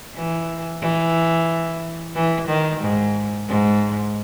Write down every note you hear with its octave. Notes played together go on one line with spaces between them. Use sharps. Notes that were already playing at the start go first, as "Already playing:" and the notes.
E3
E3
E3
D#3
G#2
G#2